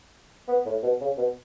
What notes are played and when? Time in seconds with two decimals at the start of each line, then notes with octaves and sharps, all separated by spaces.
0.48 B3
0.66 A2
0.83 B2
1.01 C#3
1.17 B2